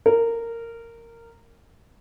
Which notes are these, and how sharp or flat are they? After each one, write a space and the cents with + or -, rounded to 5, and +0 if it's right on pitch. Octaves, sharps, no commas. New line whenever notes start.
A#4 -15